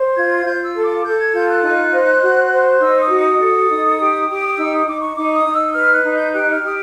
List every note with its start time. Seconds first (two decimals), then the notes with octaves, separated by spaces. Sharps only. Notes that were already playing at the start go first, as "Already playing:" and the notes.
Already playing: C5
0.16 F4 G#6
0.45 F4 G6
0.65 E6
0.76 A4
0.85 D6
1.05 A4 G6
1.19 G#6
1.34 F4 G6
1.49 F#6
1.63 D#4
1.93 C5
2.22 F#4
2.52 C5
2.80 D#4 E6
3.00 D#6
3.09 F#4
3.19 D#6
3.40 A4
3.68 D#4
3.99 G4
4.28 G4
4.57 D#4 E6
4.72 D#6
4.86 D#4 D6
5.01 C#6
5.16 D#4 D6
5.35 D#6
5.45 D#4
5.54 E6
5.74 B4 F6
5.93 F#6
6.04 D#4
6.14 G6
6.32 G4 F#6
6.53 F6
6.63 G4 D#6